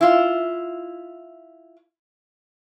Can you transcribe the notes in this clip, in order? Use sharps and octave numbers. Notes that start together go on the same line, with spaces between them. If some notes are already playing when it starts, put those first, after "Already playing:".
E4 F4